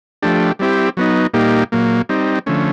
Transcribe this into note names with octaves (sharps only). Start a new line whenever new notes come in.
F3 A3 D4 G4
G3 C4 E4 G4
F#3 B3 D#4
A#2 G3 A#3 D#4 G4
A#2 F#3 A#3
G3 C4 D#4
D3 F3 A3 C#4